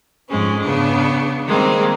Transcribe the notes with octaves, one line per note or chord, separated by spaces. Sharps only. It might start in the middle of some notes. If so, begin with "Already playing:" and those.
F2 G#2 G#3 C4 C#4
C#3 B3 D4
D#3 G3 G#3 A#3 C4